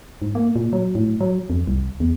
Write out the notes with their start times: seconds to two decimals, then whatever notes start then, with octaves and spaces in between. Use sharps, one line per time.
0.22 G#2
0.35 A#3
0.56 A#2
0.73 F#3
0.95 A2
1.21 F#3
1.50 F2
1.67 C2
2.00 E2